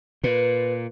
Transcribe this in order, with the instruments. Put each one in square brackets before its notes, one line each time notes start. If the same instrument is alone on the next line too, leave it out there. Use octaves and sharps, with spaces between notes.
[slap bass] A#2 [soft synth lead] B4